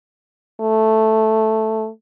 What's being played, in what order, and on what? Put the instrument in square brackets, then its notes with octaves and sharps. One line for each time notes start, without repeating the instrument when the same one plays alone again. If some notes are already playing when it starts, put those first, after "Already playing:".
[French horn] A3